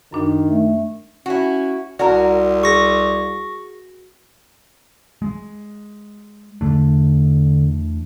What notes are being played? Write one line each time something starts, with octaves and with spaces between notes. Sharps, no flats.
F#2 D#3 D4
A3
C#4 E4 F#4
C2 F#4 A#4 D5 A#5
G#4 C#6 A#6
G#3
E2 D3 A3 D4